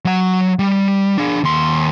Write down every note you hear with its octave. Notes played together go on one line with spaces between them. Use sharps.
F#3 F#5
G3
D4 G#4
D#2 C6